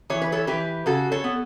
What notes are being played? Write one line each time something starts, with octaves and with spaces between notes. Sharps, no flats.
E3 C#5
B4
A4 C#5
E3 G4 B4
C#3 F#4 A4
A4 C#5
B3